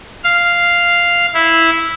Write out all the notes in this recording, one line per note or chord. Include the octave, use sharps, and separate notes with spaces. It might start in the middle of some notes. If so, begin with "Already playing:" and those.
F5
E4